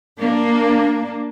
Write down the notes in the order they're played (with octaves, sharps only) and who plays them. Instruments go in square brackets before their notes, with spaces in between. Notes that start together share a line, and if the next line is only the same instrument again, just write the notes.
[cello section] A#3 D4